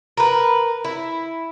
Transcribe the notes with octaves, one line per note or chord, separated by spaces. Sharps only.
A#4 B4
E4